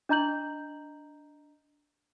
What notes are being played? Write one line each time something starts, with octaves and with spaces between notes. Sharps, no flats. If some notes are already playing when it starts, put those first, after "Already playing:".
D4 D#5 A#5 G6 F#7